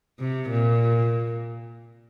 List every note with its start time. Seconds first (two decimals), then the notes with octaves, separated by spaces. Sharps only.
0.19 C3
0.49 A#2